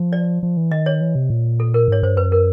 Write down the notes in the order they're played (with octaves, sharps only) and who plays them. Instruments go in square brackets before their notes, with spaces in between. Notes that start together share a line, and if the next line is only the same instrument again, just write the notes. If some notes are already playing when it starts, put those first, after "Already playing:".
Already playing: [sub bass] F3
[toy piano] D5
[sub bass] F3
E3
[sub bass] D#3 [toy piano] D#5
[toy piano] C#5
[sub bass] E3
C3
A#2
[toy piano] A4
A#4
[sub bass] G#2 [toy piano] C#5
[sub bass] G2 [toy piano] C5
[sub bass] F#2 [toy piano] B4
[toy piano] A#4